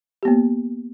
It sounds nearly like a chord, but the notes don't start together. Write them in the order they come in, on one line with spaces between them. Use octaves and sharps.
G4 B3 A#3